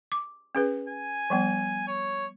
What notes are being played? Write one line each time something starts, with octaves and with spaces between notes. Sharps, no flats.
D6
C#4 G#4 B4
G#5
F3 G3 B3
C#5